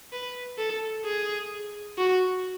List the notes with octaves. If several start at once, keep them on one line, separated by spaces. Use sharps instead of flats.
B4
A4
G#4
F#4